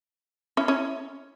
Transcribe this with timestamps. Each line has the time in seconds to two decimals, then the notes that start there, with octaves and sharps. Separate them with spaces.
0.57 C#4 E4
0.68 C#4 E4